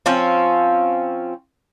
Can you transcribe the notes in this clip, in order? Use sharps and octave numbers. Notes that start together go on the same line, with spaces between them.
F3 C4 C#4